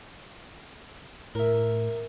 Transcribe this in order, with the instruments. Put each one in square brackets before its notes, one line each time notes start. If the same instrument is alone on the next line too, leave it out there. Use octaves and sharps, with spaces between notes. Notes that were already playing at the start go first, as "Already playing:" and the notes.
[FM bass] A2 [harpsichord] A#4 E5